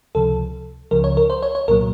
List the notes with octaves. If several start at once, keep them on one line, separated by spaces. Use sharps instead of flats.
C#2 C3 F3 A4
C#2 C#3 F3 A#4
C#5
A#4
C5
C#5
C#5
C2 A#2 F#3 A#4